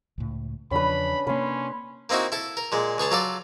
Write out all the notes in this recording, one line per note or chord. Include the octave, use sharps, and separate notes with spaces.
C#2 A2
E2 C#3 F3 C#4 D4 B4 B5
C3 A#3 C#4 B4 C6
A#3 C4 D#4 E4 F#4
E4 A4
A#4
A#2 G#3
C#2 G#4 C#5 A5
F#3 F4 A4 D5